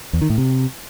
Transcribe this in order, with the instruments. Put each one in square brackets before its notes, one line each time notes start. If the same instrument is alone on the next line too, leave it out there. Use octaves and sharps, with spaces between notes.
[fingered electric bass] E2
D#3
A2
C3